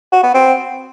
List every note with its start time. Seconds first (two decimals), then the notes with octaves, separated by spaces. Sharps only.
0.12 F#4
0.23 B3
0.34 C4